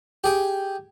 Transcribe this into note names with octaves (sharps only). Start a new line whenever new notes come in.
G4 G#4 G5